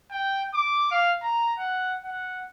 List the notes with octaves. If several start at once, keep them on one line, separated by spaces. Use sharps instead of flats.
G5
D6
F5
A#5
F#5
F#5